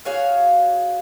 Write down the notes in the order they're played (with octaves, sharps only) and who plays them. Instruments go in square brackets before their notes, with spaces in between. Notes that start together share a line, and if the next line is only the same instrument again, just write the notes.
[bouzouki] F#4 G#4 C#5 F5